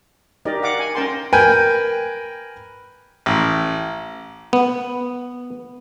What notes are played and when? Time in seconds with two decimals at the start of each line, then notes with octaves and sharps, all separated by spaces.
0.45 D#4 G4 A#4 D5 D#5
0.63 F5 F#5 D6
0.79 G#5
0.95 C#4 A#4 G5 A5 C6
1.33 A#4 B4 G5 G#5
3.26 A1
4.53 B3